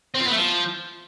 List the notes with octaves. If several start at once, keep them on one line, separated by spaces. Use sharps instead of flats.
C4
F4
B3
A3
F3